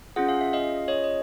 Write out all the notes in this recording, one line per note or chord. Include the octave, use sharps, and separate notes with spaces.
C#4 F4 G#4 F#5
F5
E5
D#5 F5
C#5 D#5
D#5